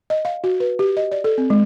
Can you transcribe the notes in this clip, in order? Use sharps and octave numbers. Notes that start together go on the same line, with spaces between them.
D#5
F5
F#4
B4
G4
D#5
D5
A4
C4
G#3